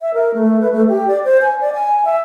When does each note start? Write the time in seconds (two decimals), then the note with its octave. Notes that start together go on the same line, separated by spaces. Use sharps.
0.01 E5
0.14 A#4
0.34 A3
0.61 B4
0.72 A3
0.88 G4
1.08 D5
1.24 C5
1.41 G#5
1.61 D5
1.73 G#5
2.05 E5